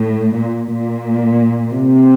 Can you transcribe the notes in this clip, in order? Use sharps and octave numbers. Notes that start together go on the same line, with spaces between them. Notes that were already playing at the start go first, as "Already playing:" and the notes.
Already playing: A2
A#2
A#2
C3